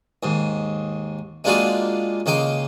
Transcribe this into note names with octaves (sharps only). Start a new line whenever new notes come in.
D#2 G#2
G#3 A#3 D4 F4 F#4 G#4
C#2 A#3 D#4 G5 C6